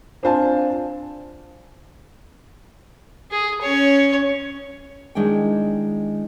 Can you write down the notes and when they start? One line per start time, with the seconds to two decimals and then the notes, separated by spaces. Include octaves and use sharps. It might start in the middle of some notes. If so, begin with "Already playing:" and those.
0.23 C4 D4 F4 C5 G#5 A5
3.31 G#4
3.61 C#4 C#5
5.15 D#3 G#3 D4 E4 G5